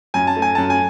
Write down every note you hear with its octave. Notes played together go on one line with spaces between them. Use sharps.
F#2 G#5
A5
A3
G#5
F#2 A5
G#5